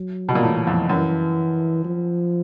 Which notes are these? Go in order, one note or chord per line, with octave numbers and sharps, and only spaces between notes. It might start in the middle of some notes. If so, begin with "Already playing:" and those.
Already playing: F#3
B2
A#2
A2 E3
F2
F#2 E3
F3